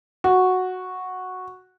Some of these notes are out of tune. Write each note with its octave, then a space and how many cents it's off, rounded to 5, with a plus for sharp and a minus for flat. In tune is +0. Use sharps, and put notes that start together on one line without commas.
F#4 -5